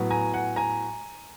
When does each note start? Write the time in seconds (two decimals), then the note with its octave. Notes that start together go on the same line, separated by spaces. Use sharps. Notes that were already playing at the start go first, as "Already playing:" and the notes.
Already playing: A2 F#3 B3
0.11 G#5 A#5
0.34 F#5 G#5
0.56 G#5 A#5